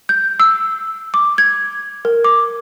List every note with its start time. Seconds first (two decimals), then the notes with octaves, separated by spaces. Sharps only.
0.09 G6
0.40 E6
1.14 D6
1.38 G#6
2.05 A#4
2.24 D6